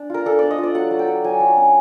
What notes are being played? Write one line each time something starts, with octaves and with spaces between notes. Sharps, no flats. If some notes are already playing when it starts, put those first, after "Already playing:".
Already playing: D4
F4 A#4
D4 A4
D4 D5
D#5
F4 D5
F#3 F#5
F#3
G5
F#3
F#3 G#5
F#3
C#4